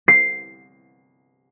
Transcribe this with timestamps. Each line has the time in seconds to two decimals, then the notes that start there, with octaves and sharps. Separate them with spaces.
0.08 C7